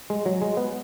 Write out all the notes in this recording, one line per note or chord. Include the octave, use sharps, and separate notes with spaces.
G#3
F#3
G#3
B3